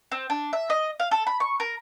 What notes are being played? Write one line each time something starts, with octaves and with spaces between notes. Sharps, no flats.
C4
D4
E5
D#5
F5
A4
B5
C#6
A#4